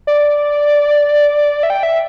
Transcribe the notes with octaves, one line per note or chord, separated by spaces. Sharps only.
D5
E5
G5
E5